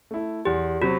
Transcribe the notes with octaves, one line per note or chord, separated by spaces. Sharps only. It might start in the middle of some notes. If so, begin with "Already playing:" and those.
A3 E4
E2 G4
C3 F#3 C4 F#4